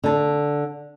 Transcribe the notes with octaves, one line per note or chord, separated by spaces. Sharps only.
D3 A5